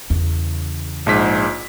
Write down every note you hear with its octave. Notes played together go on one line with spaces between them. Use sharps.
E2 C#3
A#1 G#2 B6